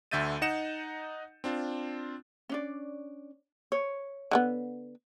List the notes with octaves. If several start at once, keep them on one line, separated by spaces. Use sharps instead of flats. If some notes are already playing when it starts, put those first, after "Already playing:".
D2 D3 E5 G6 A6 D#7
D#4 D#5 F#5 C#7 E7
C4 D4 F4
C#4 D4 D5
C#5
D3 G3 B3